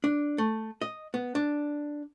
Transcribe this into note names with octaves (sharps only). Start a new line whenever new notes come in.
D4
A3
D#5
B3
D4